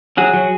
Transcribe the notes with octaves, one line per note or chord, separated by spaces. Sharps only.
F#3 F#4 G#4
F#3